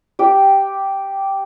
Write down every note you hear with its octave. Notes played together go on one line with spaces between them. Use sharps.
G4 G5